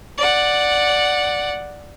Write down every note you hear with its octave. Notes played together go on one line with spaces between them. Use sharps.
D5 F#5